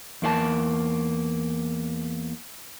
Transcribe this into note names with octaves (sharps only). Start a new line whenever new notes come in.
E2 A#3 F4 A5